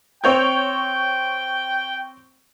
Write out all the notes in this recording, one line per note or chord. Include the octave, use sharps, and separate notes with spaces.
C4 C#5 G5 G6